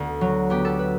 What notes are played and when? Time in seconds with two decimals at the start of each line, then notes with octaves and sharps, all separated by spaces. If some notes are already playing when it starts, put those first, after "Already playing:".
Already playing: D2 B3
0.21 F#3
0.50 B3 G4
0.65 A4
0.79 B4